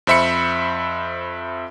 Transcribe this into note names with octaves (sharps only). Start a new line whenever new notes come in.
F2 C5 E5 B5 C#7